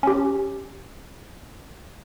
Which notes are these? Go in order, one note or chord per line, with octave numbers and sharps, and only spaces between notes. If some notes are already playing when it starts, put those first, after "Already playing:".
C#4 G4